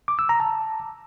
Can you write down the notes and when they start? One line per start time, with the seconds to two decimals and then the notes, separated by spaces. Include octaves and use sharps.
0.08 D6
0.19 E6
0.29 A#5
0.40 A5